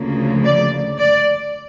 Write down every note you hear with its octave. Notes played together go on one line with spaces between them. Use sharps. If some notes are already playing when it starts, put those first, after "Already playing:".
Already playing: D2 C#3 F3 A#3
D5
D5